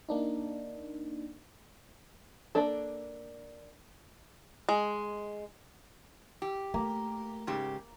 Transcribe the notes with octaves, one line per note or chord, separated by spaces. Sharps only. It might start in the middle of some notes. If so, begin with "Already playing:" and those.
A#3 D4 D#4
A#3 D4 A4
G#3
G4
A3 A#3
G#2 C#3 G4